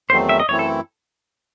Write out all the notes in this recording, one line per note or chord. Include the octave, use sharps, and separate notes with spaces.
E2 D#3 F#3 A3 C4 C5
E5
D#5
F#2 E3 A3 C4 E4 C#5
A4